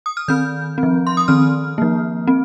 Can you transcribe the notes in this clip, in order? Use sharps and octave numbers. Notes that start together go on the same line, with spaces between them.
D#6
F6
D#3 C4 G6
C4
F3
C6
D#6
D#3 C4 F6
F3 A#3
C4